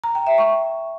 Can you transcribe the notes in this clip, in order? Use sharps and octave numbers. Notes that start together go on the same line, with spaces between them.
A#5
G5
E5
C#6